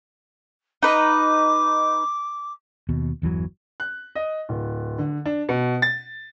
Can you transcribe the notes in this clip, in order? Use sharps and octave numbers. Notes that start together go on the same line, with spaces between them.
D#4 B4 D6
D#2 B2
G1 E2 E3 F#3
F#6
D#5
D1
D3
D4
B2
A6